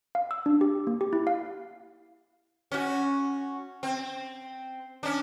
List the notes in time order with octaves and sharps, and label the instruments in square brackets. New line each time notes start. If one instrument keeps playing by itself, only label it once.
[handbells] F5
E6
D4
G4
A#3
G4
E4
F5
[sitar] C#4 F#4
C4
C#4 D4